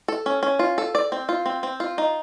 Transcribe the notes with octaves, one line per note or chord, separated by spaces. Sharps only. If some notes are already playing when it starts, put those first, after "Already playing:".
A4
C#4
C#4
F4
A4
D5
C4
F4
C4
C4
F4
D#4